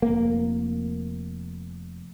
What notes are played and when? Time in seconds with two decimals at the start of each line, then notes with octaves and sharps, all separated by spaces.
0.02 F1 A#3